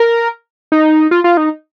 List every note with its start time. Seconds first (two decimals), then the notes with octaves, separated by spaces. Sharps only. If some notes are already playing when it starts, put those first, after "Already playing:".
Already playing: A#4
0.72 D#4
1.11 F4
1.24 F4
1.37 D#4